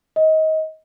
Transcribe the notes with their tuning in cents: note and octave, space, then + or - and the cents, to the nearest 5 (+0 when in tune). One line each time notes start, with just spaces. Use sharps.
D#5 +25